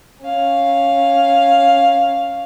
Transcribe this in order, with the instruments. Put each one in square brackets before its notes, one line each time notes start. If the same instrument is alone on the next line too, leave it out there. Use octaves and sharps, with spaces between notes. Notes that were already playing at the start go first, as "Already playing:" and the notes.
[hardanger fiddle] C#4 F5